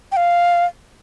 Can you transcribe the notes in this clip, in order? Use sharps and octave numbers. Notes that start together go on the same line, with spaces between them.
G5
F5